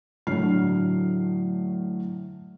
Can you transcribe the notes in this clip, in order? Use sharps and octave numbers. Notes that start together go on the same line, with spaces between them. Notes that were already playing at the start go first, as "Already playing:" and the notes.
A2 D3 F#3 F6 C7